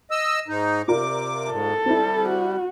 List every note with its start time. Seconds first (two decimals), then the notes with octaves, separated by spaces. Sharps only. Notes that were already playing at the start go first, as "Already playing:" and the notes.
0.11 D#5 E6
0.48 G#2 D#4
0.88 C3 F4 A#4 D5 D6
1.51 G#2 A4
1.86 G3 C4 E4
2.29 F#4